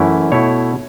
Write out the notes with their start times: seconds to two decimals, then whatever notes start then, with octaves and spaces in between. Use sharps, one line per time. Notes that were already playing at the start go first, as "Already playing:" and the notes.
Already playing: F#2 E3 A3 C#4 E4
0.32 B2 A3 E4 C#5